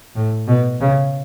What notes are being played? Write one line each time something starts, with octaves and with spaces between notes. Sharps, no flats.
A2
B2
C#3